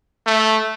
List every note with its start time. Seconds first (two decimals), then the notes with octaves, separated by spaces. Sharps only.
0.27 A3